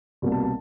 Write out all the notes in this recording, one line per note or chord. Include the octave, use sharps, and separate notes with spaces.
C2 B2 G3 A#3
A5
A5